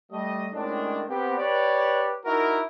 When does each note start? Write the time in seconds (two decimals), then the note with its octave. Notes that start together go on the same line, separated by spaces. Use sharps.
0.11 G3 A3 D#5
0.53 A2 D#3 G#3 C#4 D4
1.08 B3 C4 G4
1.38 G4 B4 C#5 D5
2.24 D#4 E4 F#4 A#4